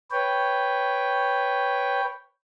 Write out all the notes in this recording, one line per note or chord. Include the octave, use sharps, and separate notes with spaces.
B4 C#5 G5